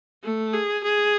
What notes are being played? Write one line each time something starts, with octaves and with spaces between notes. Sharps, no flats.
A3
G#4
G#4